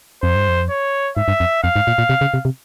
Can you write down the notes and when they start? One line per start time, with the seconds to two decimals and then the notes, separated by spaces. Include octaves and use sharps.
0.23 F2 C5
0.35 G2
0.48 F2
0.70 C#5
1.17 G#2 E5
1.28 G2
1.40 F2
1.63 F2 F5
1.76 G#2
1.87 A#2
1.98 A#2
2.09 C3
2.21 C#3
2.34 C3
2.45 C3